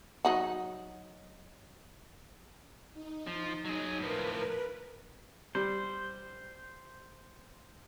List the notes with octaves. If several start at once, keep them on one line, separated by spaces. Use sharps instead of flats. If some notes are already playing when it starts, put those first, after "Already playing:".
F#3 D#4 F#4
D#4
F3
F#3 G#4
A2 F3 A#4 B4
G3 C5